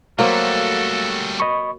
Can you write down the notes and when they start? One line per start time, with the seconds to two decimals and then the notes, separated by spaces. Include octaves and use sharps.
0.19 F#3 G3 A3 A#3 F#4 A4 C5 F5
1.40 D#5 B5 C#6